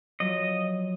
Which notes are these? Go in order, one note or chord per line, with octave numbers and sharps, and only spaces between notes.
F3 F#3 D#5